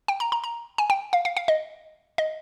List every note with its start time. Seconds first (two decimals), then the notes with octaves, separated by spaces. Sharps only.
0.08 G5
0.20 A#5
0.32 A#5
0.44 A#5
0.78 G#5
0.90 G5
1.13 F5
1.25 F5
1.37 F5
1.48 D#5
2.18 D#5